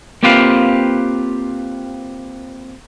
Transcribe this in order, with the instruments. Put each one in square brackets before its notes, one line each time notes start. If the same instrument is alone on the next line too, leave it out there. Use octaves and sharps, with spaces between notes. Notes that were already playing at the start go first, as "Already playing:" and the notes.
[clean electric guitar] A#3 C4 F4 G4 B4 F5